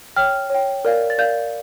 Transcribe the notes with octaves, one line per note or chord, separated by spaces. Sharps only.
C#5 G5 F6
C#5 G5
A#4 D5 F5
A6
A#4 D5 F5 G6